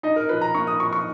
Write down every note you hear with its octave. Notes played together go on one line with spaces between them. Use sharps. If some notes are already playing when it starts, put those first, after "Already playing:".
D#4 D#5
A#4
F3 B4
A#5
A#3 C#6
D#6
F3 C#6
C#6